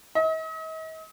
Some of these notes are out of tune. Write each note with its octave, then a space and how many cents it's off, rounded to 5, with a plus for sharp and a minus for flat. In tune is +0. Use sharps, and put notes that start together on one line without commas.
D#5 +45